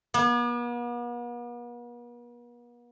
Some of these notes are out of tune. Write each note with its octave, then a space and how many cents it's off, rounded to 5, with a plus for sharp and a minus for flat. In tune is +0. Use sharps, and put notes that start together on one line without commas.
B3 -45